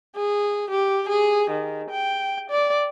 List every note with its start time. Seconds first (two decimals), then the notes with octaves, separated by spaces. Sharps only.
0.16 G#4
0.70 G4
1.09 G#4
1.50 D#3
1.90 G5
2.50 D5